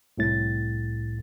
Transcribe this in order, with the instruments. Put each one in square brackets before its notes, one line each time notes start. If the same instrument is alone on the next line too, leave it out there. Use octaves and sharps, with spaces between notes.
[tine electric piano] C2 A2 A6